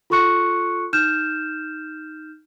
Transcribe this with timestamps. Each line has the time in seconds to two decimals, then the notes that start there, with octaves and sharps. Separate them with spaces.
0.10 F4 A4 C6 C#6 F#6 C#7
0.93 D#4 F6 G6 E7